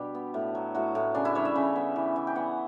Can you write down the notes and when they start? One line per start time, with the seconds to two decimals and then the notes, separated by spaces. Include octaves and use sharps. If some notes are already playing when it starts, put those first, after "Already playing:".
Already playing: B2 G3 D4 G4
0.15 B3
0.34 A2
0.55 F#3
0.75 A2 F#4
0.95 A2
1.14 C#3 D4
1.25 E4
1.35 G3 C#5
1.45 E5
1.55 C#3
1.76 B3
1.96 E3
2.16 E3
2.27 G5
2.35 B3 F#5